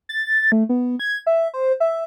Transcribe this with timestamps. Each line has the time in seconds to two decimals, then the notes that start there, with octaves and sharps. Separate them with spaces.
0.09 A6
0.52 A3
0.69 B3
1.00 G#6
1.27 E5
1.54 C5
1.80 E5